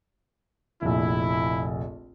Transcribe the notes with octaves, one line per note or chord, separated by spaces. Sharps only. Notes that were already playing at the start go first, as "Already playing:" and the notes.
F1 A#1 E4